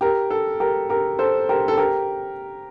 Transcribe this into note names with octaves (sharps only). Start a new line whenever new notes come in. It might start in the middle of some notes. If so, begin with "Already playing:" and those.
G4 A#4
A4
G4 A#4
G4 A#4
A4 C5
G4 A#4
A4
G4 A#4